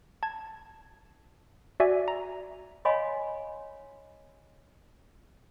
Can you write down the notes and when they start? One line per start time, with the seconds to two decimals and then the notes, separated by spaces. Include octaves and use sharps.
0.23 A5 G#6
1.80 F#4 D5 E5 G#5
2.08 A#5
2.85 C#5 D#5 F5 G#5 B5 C6